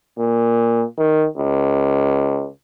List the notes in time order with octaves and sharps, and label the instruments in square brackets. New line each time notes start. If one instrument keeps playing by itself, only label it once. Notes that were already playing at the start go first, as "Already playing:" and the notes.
[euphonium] A#2
D#3
C#2